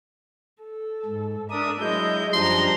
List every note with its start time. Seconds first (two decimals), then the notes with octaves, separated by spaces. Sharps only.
0.63 A4
1.06 G#2
1.50 D4 A#4 D5 E5 D#6
1.81 F#3 G#3 E4 D#5 G6
2.33 F#2 F3 G3 D4 A#5 C6